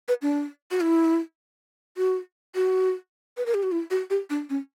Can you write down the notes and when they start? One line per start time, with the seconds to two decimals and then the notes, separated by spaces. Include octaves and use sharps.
0.08 B4
0.22 D4
0.71 F#4
0.81 E4
1.97 F#4
2.55 F#4
3.37 B4
3.46 A#4
3.54 G4
3.63 F#4
3.72 E4
3.91 F#4
4.10 G4
4.30 D4
4.50 C#4